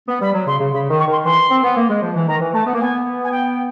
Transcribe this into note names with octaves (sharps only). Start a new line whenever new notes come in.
B3
G3 B5
F#3
C#3 C6
C#3
C#3 B5
D#3
C#6
D#3 C6
E3 C6
C4
B3
A#3
G#3
F3
E3
D#3 A#5
E3
A3 A5
B3
A#3
B3 G#5
G#5
G5